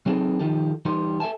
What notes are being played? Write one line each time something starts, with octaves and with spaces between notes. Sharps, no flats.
F#3 G3 C4 D#4 G#4 A4
D#3 F3 D#4 G4 A4
E3 G3 D#4 G4 C6
A4 E5 F5 G#5 A5